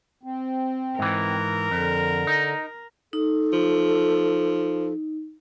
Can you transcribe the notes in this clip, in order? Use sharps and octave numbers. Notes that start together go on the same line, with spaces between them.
C4
G#2 E3 A#4
F2 D3
D#4
D#4 A4
F3